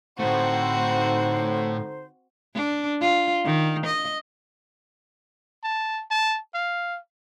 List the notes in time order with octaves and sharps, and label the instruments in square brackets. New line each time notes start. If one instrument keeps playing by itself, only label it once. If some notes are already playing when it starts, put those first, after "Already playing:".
[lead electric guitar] A2 A3 [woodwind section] D3 D#4 C5 [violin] C4 F#4
[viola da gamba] D4
F4
D#3
D#5
[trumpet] A5
A5
F5